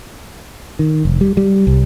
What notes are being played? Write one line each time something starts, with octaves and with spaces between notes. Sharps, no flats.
D#3
F1
G3
G3
C2